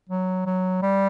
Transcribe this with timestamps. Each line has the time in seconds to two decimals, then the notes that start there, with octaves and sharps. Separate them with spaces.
0.10 F#3
0.46 F#3
0.82 G3